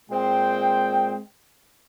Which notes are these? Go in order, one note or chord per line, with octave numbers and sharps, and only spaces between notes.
A#2 G#3 C4 G5